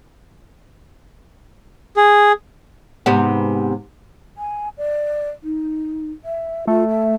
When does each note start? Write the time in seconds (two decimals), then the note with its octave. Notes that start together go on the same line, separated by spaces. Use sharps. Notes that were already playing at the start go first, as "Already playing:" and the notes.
1.97 G#4
3.06 G#2 C3 B3
4.38 G#5
4.78 D5
5.43 D#4
6.25 E5
6.67 A3 F4
6.89 E5